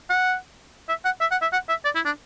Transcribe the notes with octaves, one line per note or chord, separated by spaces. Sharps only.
F#5
E5
F#5
E5
F#5
E5
F#5
E5
D5
E4
D4